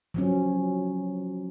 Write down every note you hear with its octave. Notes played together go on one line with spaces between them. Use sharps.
F3 F#3 C#4